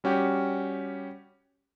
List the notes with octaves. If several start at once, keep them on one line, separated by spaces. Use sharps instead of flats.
G3 C#4 F#4 G4